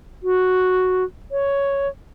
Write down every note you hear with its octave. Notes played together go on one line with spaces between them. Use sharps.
F#4
C#5